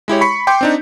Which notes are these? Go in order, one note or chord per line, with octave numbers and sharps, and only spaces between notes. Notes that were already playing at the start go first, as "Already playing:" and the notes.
G#3 E4 G4 C#5
B5 C#6 B6 C#7
G5 C6 D6 G6
C4 D4 D#4